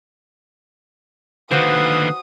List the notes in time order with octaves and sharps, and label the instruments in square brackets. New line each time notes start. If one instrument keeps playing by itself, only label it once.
[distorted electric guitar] D#2 D3 [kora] F#4 C5 [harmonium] B4 F5 [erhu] D#6